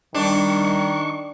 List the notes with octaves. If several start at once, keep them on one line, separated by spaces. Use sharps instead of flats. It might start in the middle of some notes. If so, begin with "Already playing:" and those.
D#3 G3 D4 C#6